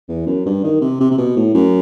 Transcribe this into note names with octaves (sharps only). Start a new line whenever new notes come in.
E2
F#2
G2
D#3
C3
C3
C3
B2
A2
F#2